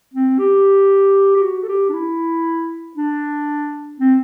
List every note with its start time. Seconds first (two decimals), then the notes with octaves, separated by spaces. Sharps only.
0.14 C4
0.39 G4
1.36 G4
1.42 F#4
1.63 A4
1.69 G4
1.89 D4
1.93 E4
2.96 D4
4.00 C4